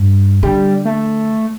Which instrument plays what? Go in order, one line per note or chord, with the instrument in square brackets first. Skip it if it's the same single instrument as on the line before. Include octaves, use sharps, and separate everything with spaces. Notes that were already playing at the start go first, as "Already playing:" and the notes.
Already playing: [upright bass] G2
[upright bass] D3 [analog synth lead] G3
[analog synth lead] A3